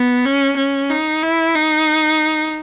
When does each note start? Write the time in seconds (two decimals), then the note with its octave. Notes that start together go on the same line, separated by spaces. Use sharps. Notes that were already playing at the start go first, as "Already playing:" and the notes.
Already playing: B3
0.25 C#4
0.57 C#4
0.90 D#4
1.23 E4
1.55 D#4